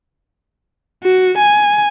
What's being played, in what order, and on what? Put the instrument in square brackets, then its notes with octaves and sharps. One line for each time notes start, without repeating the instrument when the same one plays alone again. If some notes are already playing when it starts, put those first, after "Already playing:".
[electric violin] F#4
G#5